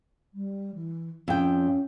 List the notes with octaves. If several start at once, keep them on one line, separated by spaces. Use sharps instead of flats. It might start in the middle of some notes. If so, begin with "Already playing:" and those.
G3
E3
F2 C#4 G5